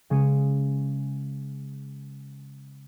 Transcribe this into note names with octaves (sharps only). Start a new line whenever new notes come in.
C#3 G#3 G#4 C#7 D#7